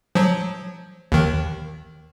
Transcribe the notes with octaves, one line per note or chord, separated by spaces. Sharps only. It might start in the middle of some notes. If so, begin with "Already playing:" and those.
F3 F#3
D#2 D#3